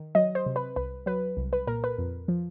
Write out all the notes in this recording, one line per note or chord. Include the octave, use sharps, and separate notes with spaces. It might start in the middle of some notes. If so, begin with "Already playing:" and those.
Already playing: D#3
F#3 D#5
C5
C3
B4
C2 B4
F#3 B4
C2
B4
A#2 A#4
B4
F2
F3